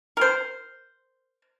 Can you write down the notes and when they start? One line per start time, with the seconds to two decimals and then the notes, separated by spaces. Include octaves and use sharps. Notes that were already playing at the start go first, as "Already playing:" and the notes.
0.17 A#4 C5